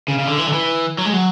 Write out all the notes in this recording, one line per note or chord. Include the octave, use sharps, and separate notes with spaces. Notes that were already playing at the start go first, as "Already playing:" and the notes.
C#3
C#3
D3
E3
D3
E3
F#3
G#3
F#3